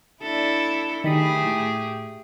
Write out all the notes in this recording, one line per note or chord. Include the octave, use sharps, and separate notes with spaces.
D4 E4 A4
D#3 A3 G4 G#4 B5 D#6
A2